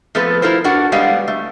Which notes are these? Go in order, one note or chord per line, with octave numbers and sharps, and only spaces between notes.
F3 A3 B3 C4 A4 B4
E4 F4 A4 A#4 C5
D4 F#4 A4 A#4 F#5
G3 G#3 B3 F5
A3